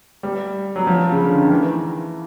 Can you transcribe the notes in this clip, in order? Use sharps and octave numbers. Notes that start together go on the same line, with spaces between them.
G3
F#3
F3
C#3
D3
D#3
E3